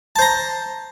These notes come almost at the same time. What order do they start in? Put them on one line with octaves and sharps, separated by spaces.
A5 C5 A#5